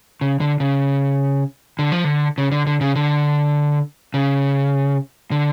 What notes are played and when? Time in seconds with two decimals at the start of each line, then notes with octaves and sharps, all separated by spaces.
0.21 C#3
0.40 D3
0.60 C#3
1.79 D3
1.92 F3
2.04 D3
2.38 C#3
2.52 D3
2.67 D3
2.81 C#3
2.95 D3
4.14 C#3
5.31 D3